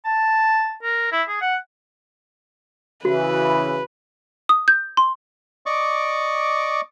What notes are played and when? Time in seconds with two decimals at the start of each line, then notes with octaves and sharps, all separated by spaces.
0.05 A5
0.83 A#4
1.12 E4
1.28 G#4
1.41 F#5
3.05 C#3 E3 F#4 B4
4.49 D#6
4.68 G6
4.97 C6
5.66 D5 D#5 C#6 D6